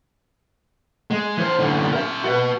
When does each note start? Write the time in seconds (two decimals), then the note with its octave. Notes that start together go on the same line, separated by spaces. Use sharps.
1.11 G#3
1.38 E3 C5
1.59 F#2 D3
1.93 A#4 E5
2.24 F#4 B4